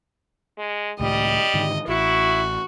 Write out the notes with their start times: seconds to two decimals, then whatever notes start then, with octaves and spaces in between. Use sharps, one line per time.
0.58 G#3
1.00 C#2 A2 D#3 G3 D#5
1.54 G#2 D3 D#3
1.88 A1 E4 F#4